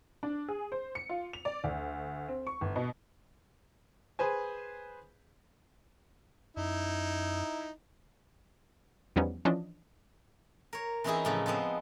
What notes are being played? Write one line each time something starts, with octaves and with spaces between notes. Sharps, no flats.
D4
G#4
C5
C#7
F4
F7
D5
D2
C4
C#6
G1
B2
G#4 B4 C5 G#5
F#2 D#4 E4
E2 F3 G3 B3 C#4 D#4
E3 F3 C#4 D4 D#5
A#4 C#5
E3 C4 C#4 D#4 E4 G#4
A2 C#3 F3
F3 G#3 B3 C4